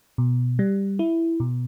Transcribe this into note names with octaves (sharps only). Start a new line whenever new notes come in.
B2
G3
E4
B2